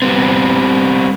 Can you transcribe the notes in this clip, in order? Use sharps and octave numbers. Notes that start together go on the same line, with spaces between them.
G3 B3 C4